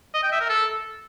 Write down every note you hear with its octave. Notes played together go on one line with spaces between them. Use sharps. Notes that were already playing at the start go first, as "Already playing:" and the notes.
D#5
G5
E5
A#4
A4